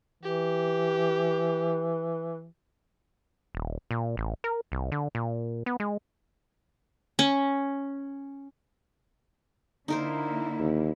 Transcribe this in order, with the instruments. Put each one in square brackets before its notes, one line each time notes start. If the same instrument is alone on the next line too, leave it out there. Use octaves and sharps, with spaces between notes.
[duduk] E3 [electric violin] G4
[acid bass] D#1
A#2
A1
A#4
C2
D3
A#2
B3
G#3
[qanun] C#4
[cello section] D3 A#3 E4 [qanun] D#4 A#4 C5
[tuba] D#2